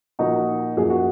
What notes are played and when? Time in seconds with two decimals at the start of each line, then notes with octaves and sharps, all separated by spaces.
0.19 A#2 F3 A#3 D#4 F#4
0.77 F#2 F3 A#3 G#4
0.90 F#4